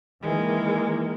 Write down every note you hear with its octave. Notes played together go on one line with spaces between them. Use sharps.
D#3 E3 G#3 A#3